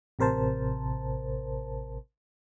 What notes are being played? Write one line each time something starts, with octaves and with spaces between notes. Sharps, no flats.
A1 C3 A#4 C5 A5